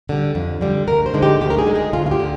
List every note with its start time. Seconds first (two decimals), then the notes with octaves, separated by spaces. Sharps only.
0.09 D3 G3
0.35 F2
0.61 D3 G3
0.88 D2 A#4
1.06 C5
1.14 D3 G#3 D#4
1.23 G4
1.41 D2 G4
1.50 A#4
1.58 G#4
1.66 D3 G#3 D#4
1.75 G#4
1.93 D2 F4
2.06 F4
2.11 G4
2.20 D3